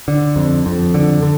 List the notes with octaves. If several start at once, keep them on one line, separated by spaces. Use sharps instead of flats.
D3
F2
F2
D3
D3